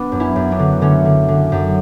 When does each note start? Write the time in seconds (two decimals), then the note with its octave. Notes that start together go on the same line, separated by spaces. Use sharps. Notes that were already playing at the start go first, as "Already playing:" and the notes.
Already playing: B3 D4
0.12 F#2
0.20 C#4 E4
0.36 F#2
0.51 B3 D4
0.59 D3
0.81 D3 A3 C#4
1.05 D3
1.28 D3
1.52 F#2